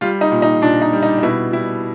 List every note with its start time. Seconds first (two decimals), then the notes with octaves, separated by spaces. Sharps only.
0.01 G3 F4
0.21 D#4
0.31 A#2
0.42 D#4
0.62 A#2 D4
0.82 D#4
0.93 G3
1.03 D#4
1.18 D#4
1.23 B2 E4
1.52 G3 E4